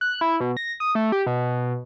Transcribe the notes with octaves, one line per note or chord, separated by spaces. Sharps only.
F#6
E4
B2
A#6
D#6
A3
G4
B2